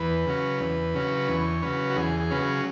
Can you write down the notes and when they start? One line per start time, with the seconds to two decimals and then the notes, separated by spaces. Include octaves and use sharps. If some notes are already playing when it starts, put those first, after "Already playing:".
Already playing: E2 B4
0.27 C#3 F#3 C#4
0.60 E2
0.94 C#3 F#3 C#4
1.28 E2 C#5
1.62 C#3 F#3 C#4 B4
1.91 F#4
1.96 E2 G#4
2.20 G#4
2.30 C#3 F#3 C#4 B4
2.42 G#4